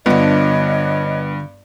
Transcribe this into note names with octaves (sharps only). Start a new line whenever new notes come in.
G2 D3 B3 D4 F4 C#5 D#5